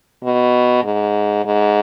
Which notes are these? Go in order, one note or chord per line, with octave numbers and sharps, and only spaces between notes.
B2
G#2
G#2